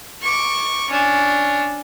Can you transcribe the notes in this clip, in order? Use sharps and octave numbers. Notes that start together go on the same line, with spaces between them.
C#6 D6
C#4 D4